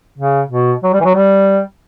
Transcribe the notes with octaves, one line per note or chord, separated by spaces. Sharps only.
C#3
B2
F#3
G3
E3
F#3
G3